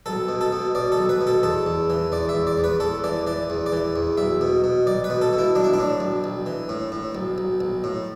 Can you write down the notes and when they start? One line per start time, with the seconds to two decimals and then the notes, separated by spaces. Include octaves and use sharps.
0.06 B1 A4
0.29 B2
0.41 A4
0.52 B2
0.75 B2 D5
0.92 A4
0.97 B1
1.09 B4
1.21 B2
1.27 A4
1.43 E2 A4
1.66 E2
1.90 E3
2.12 E2 D5
2.29 E5
2.35 E2
2.47 D5
2.57 E2
2.64 B4
2.80 E2 A4
3.04 E3 D5
3.27 E3 D5
3.50 E2
3.66 D5
3.72 E3
3.96 E2
4.17 B1 E5
4.41 B2
4.64 B2
4.87 B1 D5
5.04 B4
5.10 B2
5.21 A4
5.33 B2
5.38 E4
5.55 B1 D4
5.64 E4
5.73 D4
5.79 A2
6.00 B1
6.24 B1
6.46 E3
6.69 A2
6.92 A2
7.15 B1
7.38 B1
7.60 B1
7.84 A2